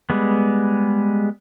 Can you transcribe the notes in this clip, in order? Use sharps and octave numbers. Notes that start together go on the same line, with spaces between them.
G3 G#3 B3